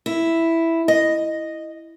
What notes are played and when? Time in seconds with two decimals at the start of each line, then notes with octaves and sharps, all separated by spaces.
0.06 E4
0.88 D#5